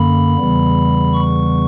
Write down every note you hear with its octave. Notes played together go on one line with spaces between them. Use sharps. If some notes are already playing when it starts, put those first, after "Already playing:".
Already playing: F#2 D3 A#3 B5
E2 C#3 E3 G3 B3
C#6